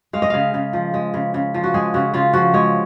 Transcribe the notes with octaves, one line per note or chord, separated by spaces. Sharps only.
G#3 F5
D#5
C#3 F5
C#3
F3
G#3
C#3
C#3
F3
F#4
G#3 G#4
C#3 F#4
C#3 F4
F3 F#4
G#3 C#5